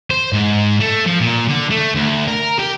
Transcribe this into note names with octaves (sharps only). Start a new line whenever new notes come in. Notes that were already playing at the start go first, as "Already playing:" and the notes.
C5
G#2
A3
F3
A#2
D3
A3
D2
A#4
G4